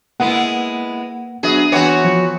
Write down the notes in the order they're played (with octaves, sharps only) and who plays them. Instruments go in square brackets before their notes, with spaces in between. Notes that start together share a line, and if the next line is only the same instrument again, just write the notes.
[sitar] G#3 B3 E4 [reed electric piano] A#3 F#5
[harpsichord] F#3 B3 F#4 [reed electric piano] D4 E5 [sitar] G#4
[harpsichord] E3 B3 C4 [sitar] F#4 C#5
[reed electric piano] F3